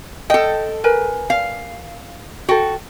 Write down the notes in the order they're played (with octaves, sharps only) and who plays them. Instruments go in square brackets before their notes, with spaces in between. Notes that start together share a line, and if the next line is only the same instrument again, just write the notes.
[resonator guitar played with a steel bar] A4 G5 [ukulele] D#5
[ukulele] A#4 B4 G#5
[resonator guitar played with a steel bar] F5
[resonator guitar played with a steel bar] F#4 [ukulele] A4 G5